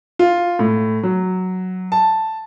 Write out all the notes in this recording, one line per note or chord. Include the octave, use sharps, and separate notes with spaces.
F4
A2
F#3
A5